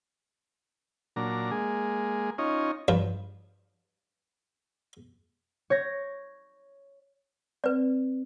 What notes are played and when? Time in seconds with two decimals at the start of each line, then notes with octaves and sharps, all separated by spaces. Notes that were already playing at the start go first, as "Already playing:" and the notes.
1.16 A#2 F#3 D4 A#5
1.51 G#3 A#3 G#4
2.38 C#4 D#4 F4 C#5 D#5
2.88 G2 F3
5.70 C#5 G6 A#6
7.64 C4 B4 D5